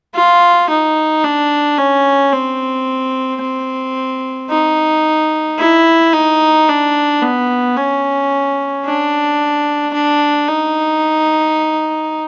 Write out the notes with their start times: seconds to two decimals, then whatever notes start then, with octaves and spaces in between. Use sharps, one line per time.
0.15 F4
0.70 D#4
1.24 D4
1.78 C#4
2.32 C4
3.41 C4
4.50 D#4
5.59 E4
6.13 D#4
6.68 D4
7.22 B3
7.77 C#4
8.85 D4
9.94 D4
10.48 D#4